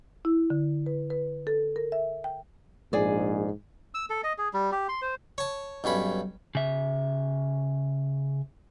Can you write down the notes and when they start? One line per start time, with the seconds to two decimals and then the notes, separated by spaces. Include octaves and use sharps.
0.25 E4
0.50 D3
0.86 B4
1.10 B4
1.47 A4
1.76 A#4
1.92 E5
2.24 G5
2.93 A#1 G#2 G#4 D5
3.94 E6
4.10 A4
4.24 D#5
4.38 G#4
4.53 G3
4.72 G4
4.89 C6
5.02 C5
5.38 C#5 A5
5.84 B1 G2 C#4 B5
6.55 C#3 E5